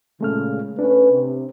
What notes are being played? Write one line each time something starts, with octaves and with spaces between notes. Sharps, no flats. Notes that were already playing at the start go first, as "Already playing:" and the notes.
A#2 C#3 G#3 A3 F6
A3 C#4 D4 B4
C3